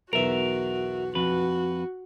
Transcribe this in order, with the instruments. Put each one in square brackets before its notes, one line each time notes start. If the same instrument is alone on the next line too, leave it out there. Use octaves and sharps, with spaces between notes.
[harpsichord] B1 E2 [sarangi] F#4 [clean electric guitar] A#4 E5
[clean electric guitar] F2 B4 [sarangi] F#4